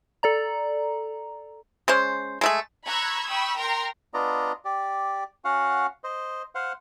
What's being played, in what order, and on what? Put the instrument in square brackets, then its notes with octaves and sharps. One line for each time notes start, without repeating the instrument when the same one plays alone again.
[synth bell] A4 D5 A#5
[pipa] G#3 C#4 C5
G#3 A3 G#4
[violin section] A#5 B5 C#6 E6 F#6 G#6
G5 B5 C#6 D#6 E6
A#4 G5 A#5 C6 F6
[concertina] B3 D4 F4 D5 D#5 A#5
G4 D5
C#4 F#4 F5 F#5
C5 D#5
C5 F5 F#5